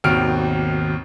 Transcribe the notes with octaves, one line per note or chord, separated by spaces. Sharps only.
G#1 D#2 B2 F6 D7